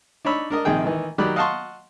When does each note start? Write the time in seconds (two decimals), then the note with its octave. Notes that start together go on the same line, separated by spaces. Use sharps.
0.25 D4 D#4 C#5 B5 E6
0.50 D4 A#4 D#5
0.65 A#1 C3 D#3 G#4 G5
0.84 D#3 E3
1.18 D#3 F#3 G4 D5 B5 F#6
1.36 D#5 F5 F#5 A5 C6 C#6